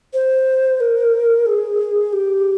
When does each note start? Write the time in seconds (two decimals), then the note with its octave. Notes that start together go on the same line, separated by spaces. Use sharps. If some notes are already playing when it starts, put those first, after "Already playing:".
0.13 C5
0.80 A#4
1.46 G#4
2.13 G4